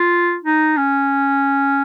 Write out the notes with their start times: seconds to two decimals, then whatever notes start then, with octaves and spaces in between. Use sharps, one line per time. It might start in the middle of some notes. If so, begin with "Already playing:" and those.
Already playing: F4
0.44 D#4
0.77 C#4